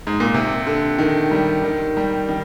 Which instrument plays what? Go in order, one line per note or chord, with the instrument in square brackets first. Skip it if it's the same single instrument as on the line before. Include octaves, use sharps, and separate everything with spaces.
[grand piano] G#2
A#2
C3
D3
D#3
G3
D#3
G3
D#3